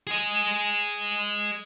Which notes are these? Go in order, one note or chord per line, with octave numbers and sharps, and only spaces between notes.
G#4 D#5